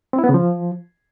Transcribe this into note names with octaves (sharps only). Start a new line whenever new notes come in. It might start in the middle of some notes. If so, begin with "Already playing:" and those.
C4
E4
B3
C#3
F3